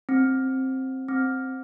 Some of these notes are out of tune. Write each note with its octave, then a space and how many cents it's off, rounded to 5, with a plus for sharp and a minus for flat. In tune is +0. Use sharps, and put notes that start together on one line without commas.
C4 +10
C4 +5